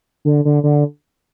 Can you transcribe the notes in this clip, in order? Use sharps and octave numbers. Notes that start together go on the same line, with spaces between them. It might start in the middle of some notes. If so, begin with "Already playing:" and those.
D3
D3
D3